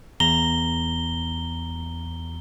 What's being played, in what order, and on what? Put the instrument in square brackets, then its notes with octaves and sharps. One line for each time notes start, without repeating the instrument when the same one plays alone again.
[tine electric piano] E2 A#5 [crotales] G7